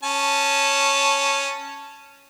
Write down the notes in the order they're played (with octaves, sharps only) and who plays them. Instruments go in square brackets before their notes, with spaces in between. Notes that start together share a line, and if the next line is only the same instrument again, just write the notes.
[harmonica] C#4 A5